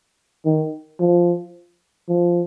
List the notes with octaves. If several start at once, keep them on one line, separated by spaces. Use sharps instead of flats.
D#3
F3
F3